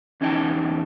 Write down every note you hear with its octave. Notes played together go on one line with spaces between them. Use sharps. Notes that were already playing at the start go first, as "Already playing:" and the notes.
E2 C#4 D#4 D#5 G5 A5